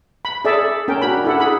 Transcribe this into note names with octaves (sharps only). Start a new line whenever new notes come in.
B5
G#4 A4 D5 E5
C#4 A#4 G5
D4 F#4 A#4 B5
E4 A4 F#5
G#4 B5